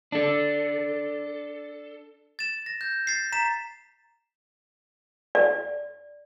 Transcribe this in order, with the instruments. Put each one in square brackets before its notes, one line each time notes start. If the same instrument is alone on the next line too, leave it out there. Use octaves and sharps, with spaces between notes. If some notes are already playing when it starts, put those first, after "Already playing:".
[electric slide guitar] D4 A4
[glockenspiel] A6 E7
A#6
G6
A6 C7
A#5 B6 E7
[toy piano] D5